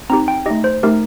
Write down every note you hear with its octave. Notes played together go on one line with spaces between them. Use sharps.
C4 D#4 G4 A#5
G5
A3 D#4 G4 D#5
C5
A3 D#4 G4 A#4